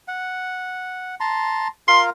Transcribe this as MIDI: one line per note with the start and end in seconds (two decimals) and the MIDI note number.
0.08 1.15 78
1.20 1.68 81
1.20 1.68 82
1.20 1.68 84
1.88 2.10 65
1.88 2.10 70
1.88 2.10 77
1.88 2.03 84